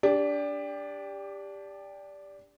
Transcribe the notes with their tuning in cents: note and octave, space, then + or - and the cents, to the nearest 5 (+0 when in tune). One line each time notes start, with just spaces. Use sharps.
D4 -15 G4 +20